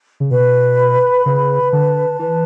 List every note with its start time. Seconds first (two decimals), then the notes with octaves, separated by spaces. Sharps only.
0.20 C#3
0.30 B2 B4
0.79 B5
1.25 C#3 B4
1.72 D3 A5
2.19 E3 B4